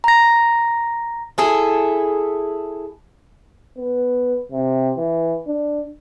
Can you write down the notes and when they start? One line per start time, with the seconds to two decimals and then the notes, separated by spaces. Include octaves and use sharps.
0.04 A#5 A#6
1.38 E4 G#4 A4
3.78 B3
4.52 C3
4.97 E3
5.47 D4